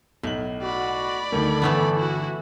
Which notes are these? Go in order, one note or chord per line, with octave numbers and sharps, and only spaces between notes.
B1 A2 F#7
F#4 D5 B5
D2 D#3 A4
G1 E3 A3 B3
E4 F#4